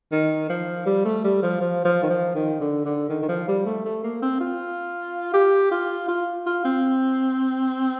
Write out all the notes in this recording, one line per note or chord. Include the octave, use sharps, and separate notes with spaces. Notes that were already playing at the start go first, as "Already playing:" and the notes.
D#3
F3
G3
A3
G3
F3
F3
F3
D#3
F3
D#3
D3
D3
D#3
D#3
F3
G3
A3
A3
A#3
C4
F4
G4
F4
F4
F4
C4